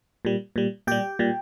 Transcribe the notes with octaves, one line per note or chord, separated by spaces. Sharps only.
A#2 G3
A#2 G3
A#2 G3 G4 G5
A#2 G3